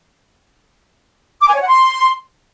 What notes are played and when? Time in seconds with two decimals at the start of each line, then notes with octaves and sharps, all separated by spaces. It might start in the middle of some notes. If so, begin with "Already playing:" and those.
1.41 D6
1.48 G#5
1.55 C#5
1.61 F#5
1.68 C6